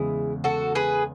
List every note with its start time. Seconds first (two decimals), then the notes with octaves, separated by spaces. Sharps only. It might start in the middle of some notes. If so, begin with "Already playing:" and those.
Already playing: E2 C#3 G#3 E4 G#4
0.44 F#4 A4
0.75 G#4 B4